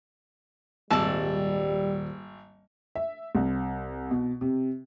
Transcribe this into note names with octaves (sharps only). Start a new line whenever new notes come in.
D#1 G#1 G3 D5 A5 E6
E5
C2
B2
C3